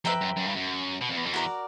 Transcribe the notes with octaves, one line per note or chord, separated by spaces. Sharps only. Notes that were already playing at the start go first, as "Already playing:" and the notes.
F2 B4 E5 G5 A#5
F#2
F#2
G2
F#2
B2
F2
E2
F2
E2 F#4 A#4 D5